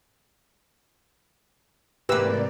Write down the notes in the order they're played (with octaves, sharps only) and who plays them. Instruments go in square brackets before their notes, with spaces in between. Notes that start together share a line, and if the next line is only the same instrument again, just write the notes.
[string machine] G#2 C3 D5 [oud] E3 A#3 [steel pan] G4 B4 E6